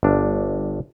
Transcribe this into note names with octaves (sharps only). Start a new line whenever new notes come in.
G1 D4